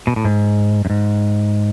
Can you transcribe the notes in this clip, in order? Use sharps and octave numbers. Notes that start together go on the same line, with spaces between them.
B2
A2
G#2
F#2
G#2